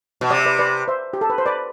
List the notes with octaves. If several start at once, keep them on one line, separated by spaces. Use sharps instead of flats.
B2
C3 D5
E5
B4 D5
B4 D5
C5 E5
G4
A4
B4
C5
B4 D5